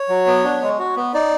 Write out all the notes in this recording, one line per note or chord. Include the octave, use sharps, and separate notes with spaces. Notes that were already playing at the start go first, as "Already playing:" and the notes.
Already playing: C#5
F#3
B3
D4
G#3
F#4
B3
D#4 D5